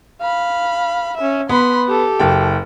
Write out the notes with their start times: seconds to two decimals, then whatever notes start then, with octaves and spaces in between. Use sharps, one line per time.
0.21 F5 B5
1.17 C#4 E5
1.49 B3 B5 C6
1.88 G4 A4
2.20 F#1 G5